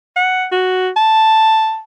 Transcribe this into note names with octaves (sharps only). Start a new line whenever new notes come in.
F#5
F#4
A5